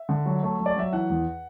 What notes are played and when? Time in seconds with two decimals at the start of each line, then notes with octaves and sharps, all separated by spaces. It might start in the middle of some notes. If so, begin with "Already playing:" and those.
Already playing: E5
0.09 D3
0.26 F#3
0.43 A3
0.59 F#3
0.66 D5
0.76 F#3 E5
0.92 E3 F#5
1.10 E2